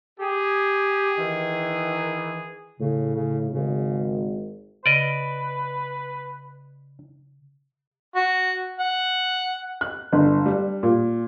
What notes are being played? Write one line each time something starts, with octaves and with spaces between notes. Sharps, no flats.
G4 G#4
D#3 E3
A2 C#3
C#3
G#1 C#3
C#3 B4 D5 D#5
F#4
F#5
F#6
G1
G3
A#2